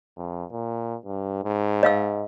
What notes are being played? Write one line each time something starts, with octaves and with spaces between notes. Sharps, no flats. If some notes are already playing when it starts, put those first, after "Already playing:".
F2
A#2
G2
G#2
D#5 F5 E6